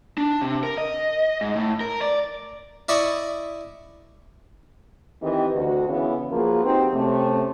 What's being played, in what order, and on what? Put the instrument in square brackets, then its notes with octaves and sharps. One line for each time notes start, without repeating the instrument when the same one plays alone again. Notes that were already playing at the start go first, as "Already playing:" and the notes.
[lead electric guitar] D4
C3
A#4
D#5
G#2
A2
A#4
D5
[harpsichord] E4 D5 D#5 B5 C#6
[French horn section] D#3 E3 C4 G4 D#5
D2 D3 F#4
C#3 E3 B3 C#4 E4
F3 A#3 F#4 G#4 A#4 B4
C4 D#4 F#4 G4 C5
C3 A3 C#4